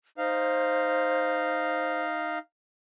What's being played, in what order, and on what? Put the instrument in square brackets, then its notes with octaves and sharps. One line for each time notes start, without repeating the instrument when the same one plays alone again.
[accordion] D#4 F5 [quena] C5